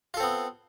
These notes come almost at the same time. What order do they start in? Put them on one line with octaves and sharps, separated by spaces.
F4 A4 C4 B3